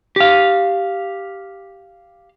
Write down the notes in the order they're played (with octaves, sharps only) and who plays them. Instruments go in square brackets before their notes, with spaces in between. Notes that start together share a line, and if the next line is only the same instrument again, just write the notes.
[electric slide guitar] G4 F5